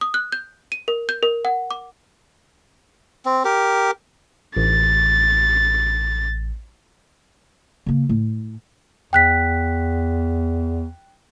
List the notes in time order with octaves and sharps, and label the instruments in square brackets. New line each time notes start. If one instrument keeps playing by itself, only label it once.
[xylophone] D#6
F#6
G6
D#7
A#4
G6
A#4
F#5
D6
[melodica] C4
G4 A#4
[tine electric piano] A1 [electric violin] A6
[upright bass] C#3 A#3
A2
[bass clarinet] E2 [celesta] G5 F#6 B6